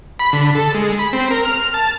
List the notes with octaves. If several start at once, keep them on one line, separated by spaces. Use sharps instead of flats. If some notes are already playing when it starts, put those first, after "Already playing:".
B5
D3
A4
G#3
B5
C4
A#4
F6
A5